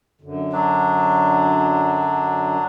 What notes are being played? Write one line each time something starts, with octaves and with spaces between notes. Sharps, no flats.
F#2 D3
F#3 D4